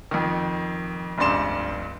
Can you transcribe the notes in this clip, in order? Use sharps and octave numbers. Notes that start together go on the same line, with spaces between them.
F2 D#3
F1 C#2 G2 D5 C6 E7